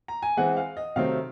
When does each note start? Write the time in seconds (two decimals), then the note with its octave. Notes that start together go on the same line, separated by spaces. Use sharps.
0.08 A#5
0.22 G#5
0.37 E3 G#3 C4 F#5
0.57 F5
0.77 D#5
0.96 C3 D#3 F#3 A3 C4 F5